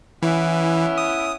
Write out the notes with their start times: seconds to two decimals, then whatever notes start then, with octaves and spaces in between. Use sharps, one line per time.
0.22 E3 B3 C#4 E4
0.98 D#6